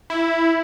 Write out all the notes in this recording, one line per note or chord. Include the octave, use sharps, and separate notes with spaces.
E4